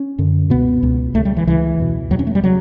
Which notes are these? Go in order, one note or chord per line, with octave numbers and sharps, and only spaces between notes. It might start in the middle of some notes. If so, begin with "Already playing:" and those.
Already playing: C#4
F#2 D3
C#2 B2 B3
C#2 B2
C#2 C#3 A3
G3
E3
C#2 C#3 E3
E2 B2
E2 B2 F#3
C#4
A3
G3
C#3 F#3